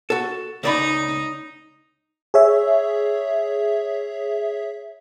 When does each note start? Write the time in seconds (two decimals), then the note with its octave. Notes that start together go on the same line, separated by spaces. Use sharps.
0.10 F#4 A4
0.63 C#2 D#4 D5 B5
2.34 G#4 C#5 E5